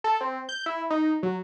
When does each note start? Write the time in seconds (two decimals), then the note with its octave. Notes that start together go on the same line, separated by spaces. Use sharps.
0.04 A4
0.21 C4
0.49 G6
0.66 E4
0.90 D#4
1.23 F#3